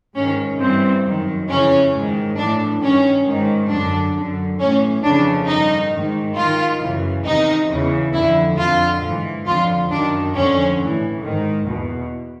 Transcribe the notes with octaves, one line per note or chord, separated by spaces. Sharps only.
G#2 D#3 C#4
G2 E3 C4
F#2 D#3
F2 C#3 E3 C#4
G#2
D#3
A2 E3 D4
G2 D#3 C#4
G#2 D#3
F#2 D3 D4
F#2 D3
A2 E3 C#4
F2 C#3 E3 D4
G2 D#3 D#4
G#2 D#3
G#2 D#3 F4
F#2 C#3 E3
E2 C3 D#3 D#4
E2 C#3 E3
F2 D3 E4
F2 D3 F4
G#2 E3
F2 D3 F4
F#2 D#3 D4
F2 D3 C#4
A2
E3
G#2 D#3
E2 B2